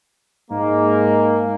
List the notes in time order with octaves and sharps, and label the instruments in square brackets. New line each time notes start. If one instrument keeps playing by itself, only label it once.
[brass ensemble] G#2 G#3 A#3